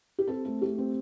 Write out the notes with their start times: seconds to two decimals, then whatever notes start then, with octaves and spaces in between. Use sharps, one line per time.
0.18 G4
0.27 C4 A4
0.45 A3 A4
0.62 A3 G4
0.78 C4